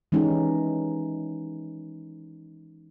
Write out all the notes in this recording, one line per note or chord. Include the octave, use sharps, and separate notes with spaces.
E3 G#3 C#4 D#4 G4